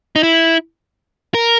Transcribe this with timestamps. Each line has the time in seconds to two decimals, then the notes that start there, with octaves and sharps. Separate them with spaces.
0.16 D#4
0.23 E4
1.35 A#4